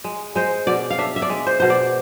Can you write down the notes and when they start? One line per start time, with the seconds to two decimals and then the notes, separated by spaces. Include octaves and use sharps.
0.04 G#3
0.36 G#3 C5
0.67 B2 D5
0.90 F5
0.98 D4 E5
1.16 E5
1.22 D5
1.30 G#3
1.47 C5
1.60 B2 C5
1.70 D5